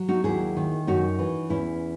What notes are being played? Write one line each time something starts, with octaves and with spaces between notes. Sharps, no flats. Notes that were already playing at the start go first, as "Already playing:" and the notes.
Already playing: F#3
D#4 F#4
D#2 E4 G#4
D#3
F#2 D#4 F#4
E3
E2 C#4 E4